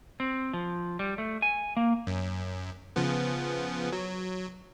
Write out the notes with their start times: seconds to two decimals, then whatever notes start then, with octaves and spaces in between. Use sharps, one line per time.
0.20 C4
0.53 F3
0.99 G3
1.18 A3
1.42 G#5
1.77 A#3
2.07 F#2
2.96 C#3 F3 B3
3.93 F#3